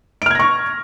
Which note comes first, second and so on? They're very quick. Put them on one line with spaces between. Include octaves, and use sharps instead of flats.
D7 F6 G#6 A#6 C#6